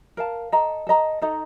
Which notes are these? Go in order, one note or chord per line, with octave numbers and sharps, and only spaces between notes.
A#4 F5 A5
A4 D#5 A#5
A4 D#5 A#5
D#4 A4 D#5 A#5